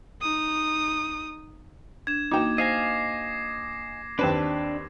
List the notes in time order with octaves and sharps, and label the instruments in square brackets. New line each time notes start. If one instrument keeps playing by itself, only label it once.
[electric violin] D#4 D#6
[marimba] D4 [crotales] G#6 E7
[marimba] A#3 F#4 [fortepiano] D#4 G5 [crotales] D6 E7
[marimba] C5 [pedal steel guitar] D#5 F5 G#5 [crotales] A#6 C7
[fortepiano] D#2 C4 B4 [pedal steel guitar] D4 A5